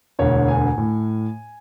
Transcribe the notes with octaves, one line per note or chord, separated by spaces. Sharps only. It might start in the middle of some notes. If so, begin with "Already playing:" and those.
E1 D2 D3 C#5
G#5
A2